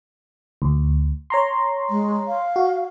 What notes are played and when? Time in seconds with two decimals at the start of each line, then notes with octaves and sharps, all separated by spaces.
0.62 D2
1.30 C#5 A#5 C6
1.90 G#3
2.28 F5
2.56 F#4